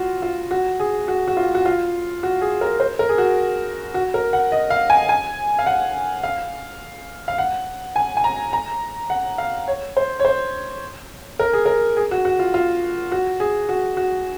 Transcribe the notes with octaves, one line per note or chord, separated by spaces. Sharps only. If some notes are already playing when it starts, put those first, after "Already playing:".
Already playing: F4 F#4
F4
F#4
G#4
F#4
F#4
F4
F#4
F4
F#4
G#4
A#4
C5
A#4
G#4
F#4
F#4
A#4
F#5
D#5
F5
G#5
G#5
F5
F#5
F5
F5
F#5
G#5
G#5
A#5
A#5
F#5
F5
C#5
C5
C#5
C5
A#4
G#4
A#4
G#4
F#4
F#4
F4
F4
F#4
G#4
F#4
F#4